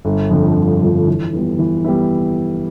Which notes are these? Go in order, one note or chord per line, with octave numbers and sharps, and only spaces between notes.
G1
F2 D3 F3
G1
F2 D3 F3
E3
G3 B3 E4
E3
G3 B3 E4